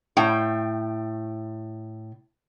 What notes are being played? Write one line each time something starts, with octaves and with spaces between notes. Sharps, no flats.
A2 G5